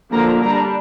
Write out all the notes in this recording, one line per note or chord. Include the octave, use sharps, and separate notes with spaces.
D3 F3 A#3 D4 A#5
G3 D4 A#5